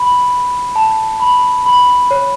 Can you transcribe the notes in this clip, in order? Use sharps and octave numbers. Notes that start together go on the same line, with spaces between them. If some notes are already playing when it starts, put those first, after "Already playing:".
Already playing: B5
A5
B5
B5
C#5